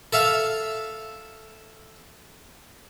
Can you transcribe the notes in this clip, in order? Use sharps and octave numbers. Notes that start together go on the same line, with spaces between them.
A4 E5 F5